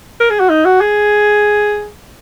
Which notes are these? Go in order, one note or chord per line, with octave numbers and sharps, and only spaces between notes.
A#4
G#4
F#4
D#4
F#4
G#4